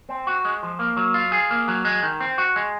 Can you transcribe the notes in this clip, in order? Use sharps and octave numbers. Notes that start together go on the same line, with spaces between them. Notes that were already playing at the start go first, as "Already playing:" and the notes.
C4
F#4
G#3
F3
A#3
F#3
F4
G#4
A#3
F#3
G#3
D#3
C4
F#4
G#3